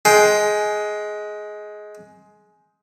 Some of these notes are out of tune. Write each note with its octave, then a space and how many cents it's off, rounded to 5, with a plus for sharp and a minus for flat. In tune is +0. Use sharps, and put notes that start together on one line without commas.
G#3 +15 G#4 +15 G5 +0